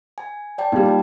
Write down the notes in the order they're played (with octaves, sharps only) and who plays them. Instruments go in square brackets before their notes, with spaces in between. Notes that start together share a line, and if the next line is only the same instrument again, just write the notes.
[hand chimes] G#5
D5 G5 A5
[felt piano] A#2 G3 [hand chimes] D#4
[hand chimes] G5 A5